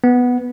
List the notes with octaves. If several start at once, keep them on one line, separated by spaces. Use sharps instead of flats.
B3